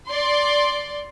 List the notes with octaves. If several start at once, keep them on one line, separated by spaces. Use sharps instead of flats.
D5 C6